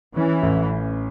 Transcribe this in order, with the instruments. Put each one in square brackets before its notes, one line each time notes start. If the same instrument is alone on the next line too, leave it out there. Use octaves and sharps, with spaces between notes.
[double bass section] E3 [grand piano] C#4
[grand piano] A1